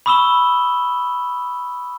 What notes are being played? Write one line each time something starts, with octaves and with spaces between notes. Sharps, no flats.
B5 C#6 D#6 E6 E7 G7